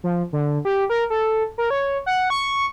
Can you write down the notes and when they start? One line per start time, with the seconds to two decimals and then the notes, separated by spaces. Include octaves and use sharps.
0.04 F3
0.33 D3
0.65 G4
0.90 A#4
1.10 A4
1.58 A#4
1.70 C#5
2.06 F#5
2.30 C#6